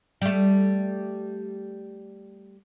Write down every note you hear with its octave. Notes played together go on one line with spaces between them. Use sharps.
G3 A3